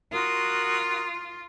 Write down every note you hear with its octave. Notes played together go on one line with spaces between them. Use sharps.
F4 F#4 A#4 D#6